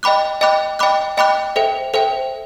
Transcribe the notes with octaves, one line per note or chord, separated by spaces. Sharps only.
D#5 G5 B5 D6 F#6
D#5 G5 B5 D6 F#6
D#5 G5 B5 D6 F#6
D#5 G5 B5 D6 F#6
A4 C5 E5 G5
A4 C5 E5 G5